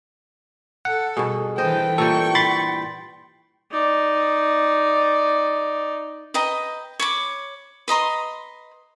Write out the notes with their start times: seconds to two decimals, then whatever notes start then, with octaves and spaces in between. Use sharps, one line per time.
0.85 A4 F#5
1.17 G2 B2 G#4
1.58 E3 A4 B4 C5 D#5 G5
1.98 A#2 E3 G3 A4 C#6
2.35 B5 C6 A6
3.71 D#4 D5
6.34 B4 D#5 G5 A#5
7.00 C#5 B5 D6
7.88 B4 D#5 A#5 C6